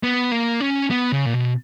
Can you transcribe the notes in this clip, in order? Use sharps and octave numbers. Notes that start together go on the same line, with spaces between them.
B3
A#3
C#4
B3
C#3
A#2
B2